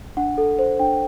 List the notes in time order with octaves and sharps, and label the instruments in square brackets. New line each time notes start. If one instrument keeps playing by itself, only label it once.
[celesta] D4 F#5
A4
C5
D4 G5